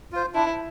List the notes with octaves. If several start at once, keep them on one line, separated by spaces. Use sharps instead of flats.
F4 C5
D4 E4